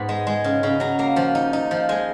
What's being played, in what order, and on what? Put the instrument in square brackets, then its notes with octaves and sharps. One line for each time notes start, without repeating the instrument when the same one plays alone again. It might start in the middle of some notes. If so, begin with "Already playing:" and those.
Already playing: [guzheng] G#2 B3 B5
G#3
G#3
C#3
C#3
F#3 A#5
A#3 A#5
F3
D#4
D#4
F3
G#3 G#5